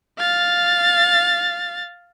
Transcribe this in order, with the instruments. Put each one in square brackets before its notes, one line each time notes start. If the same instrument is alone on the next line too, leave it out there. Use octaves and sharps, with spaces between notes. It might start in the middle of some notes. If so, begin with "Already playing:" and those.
[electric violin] F5 A6